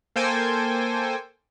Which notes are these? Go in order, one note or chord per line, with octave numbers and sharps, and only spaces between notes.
A#3 A4 C5 G5 G#5